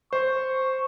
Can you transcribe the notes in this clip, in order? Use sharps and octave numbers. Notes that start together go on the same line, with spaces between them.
C5 C#6